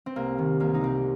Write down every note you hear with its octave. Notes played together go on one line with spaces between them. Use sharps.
C4
C2 A#3
C3 D#3
C2 A#3
D#4
C3 D#3 C4